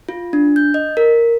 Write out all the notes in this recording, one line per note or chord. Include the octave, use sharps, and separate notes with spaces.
F4
D4
G6
D#5
A#4